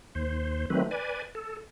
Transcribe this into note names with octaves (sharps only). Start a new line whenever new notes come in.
D#2 C5
D#3 F#3 A3 C4 B4
B4 D5 G#5
A4